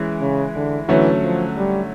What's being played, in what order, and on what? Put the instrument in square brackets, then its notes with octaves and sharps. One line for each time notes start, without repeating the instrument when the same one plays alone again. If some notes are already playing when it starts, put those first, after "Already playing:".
Already playing: [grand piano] E3 G#3 C#4 E4
[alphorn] C#3
D3
[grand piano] D3 F#3 A3 C#4 [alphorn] E3
[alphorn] F3
G3